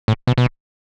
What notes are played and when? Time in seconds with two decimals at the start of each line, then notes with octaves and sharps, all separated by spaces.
0.08 A2
0.27 B2
0.38 B2